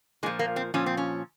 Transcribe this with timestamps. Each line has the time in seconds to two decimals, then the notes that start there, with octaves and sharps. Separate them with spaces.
0.23 A#2 G#3
0.26 F3
0.39 A#3
0.56 C4
0.74 A#2 F3 C#4
0.86 C4
0.97 C#4